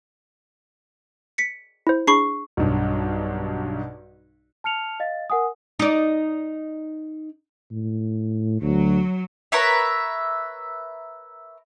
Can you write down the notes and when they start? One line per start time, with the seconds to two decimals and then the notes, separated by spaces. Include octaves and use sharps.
1.38 B6 C#7
1.87 E4 C5
2.07 D4 G#4 B5 C#6 C7
2.57 B1 G2
4.64 A5 F6 C#7 F7
5.00 D#5 F5 A6
5.30 A#4 F#5 G#5 D#6
5.79 D#4 D5
7.72 A2
8.62 D2 F#3
9.52 A#4 B4 C#5 E5